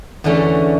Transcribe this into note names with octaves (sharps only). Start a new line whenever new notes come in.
E2 D3 A3 C#4